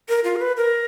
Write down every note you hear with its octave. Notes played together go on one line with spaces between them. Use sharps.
A#4
F4
A#4
B4
A#4